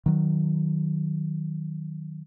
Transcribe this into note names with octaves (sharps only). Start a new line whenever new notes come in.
D#3 F#3